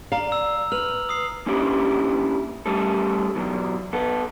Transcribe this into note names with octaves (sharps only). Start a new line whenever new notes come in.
D5 F5 A#5 F7
E6
B4 F6 F7 F#7
D#6 C7
A#3 C#4 D4 E4 G4
G3 A3 C#4 A4
E2 B2 F#3
B3 A4